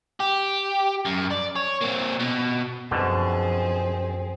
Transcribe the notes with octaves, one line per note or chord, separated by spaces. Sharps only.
G4
F#2
D5
C#5
A#3 C4
B2
F#2 B2 D3 F3 C4 G#4